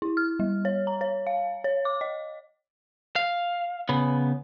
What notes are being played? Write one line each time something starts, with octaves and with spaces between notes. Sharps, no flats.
E4
F6
G3
C#5
A#5
C#5
F5
C#5
D6
D#5
F5
C#3 B3